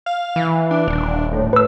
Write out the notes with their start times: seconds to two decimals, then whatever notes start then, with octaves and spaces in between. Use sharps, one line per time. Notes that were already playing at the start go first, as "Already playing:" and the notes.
0.06 F5
0.36 E3
0.71 D4
0.88 D#1
1.33 A2
1.53 B4 E6